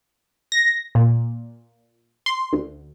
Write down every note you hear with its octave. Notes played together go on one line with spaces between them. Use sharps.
A#6
A#2
C6
D2